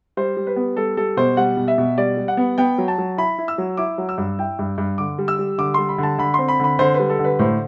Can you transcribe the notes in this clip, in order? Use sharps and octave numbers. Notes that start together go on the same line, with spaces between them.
G3 C5
G3
B4
B3
G3 A4
G3 A4
B2 C5
G3 F#5
B2
E5
B2
G3 D5
G3
F#5
B3
B3 G5
F#3
A5
F#3
E4 B5
E4
E6
F#3
E4 D6
F#3
E6
G2
E4 G5
G2
G2
D3 D6
G3
E6
G3
D3 D6
G3 C6
B5
D3
A5
D3 B5
C4 C6
B5
D3 B5
D3 C5
B4
G3
A4
D3
B4
A2 C5